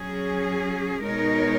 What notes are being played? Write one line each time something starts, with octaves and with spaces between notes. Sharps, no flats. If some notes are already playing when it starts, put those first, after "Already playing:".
Already playing: F#3 C#4 G#4
B2 G#3 D#4 A#4 C#5